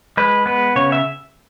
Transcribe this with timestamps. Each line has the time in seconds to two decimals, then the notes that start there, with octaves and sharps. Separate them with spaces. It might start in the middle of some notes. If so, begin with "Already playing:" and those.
0.17 G#3 B4
0.46 B3 B4
0.76 C#3 C#5
0.92 E5